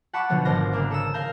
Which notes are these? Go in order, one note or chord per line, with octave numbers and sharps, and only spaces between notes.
F#5 A5 B5 C#6 D6
B2 D3 F3 B3 C#4
G#1 B3 C5 F5 D6 A#6
C#3 A#3 D4 D6
A4 D#6 E6
A#4 F5 A#5 G6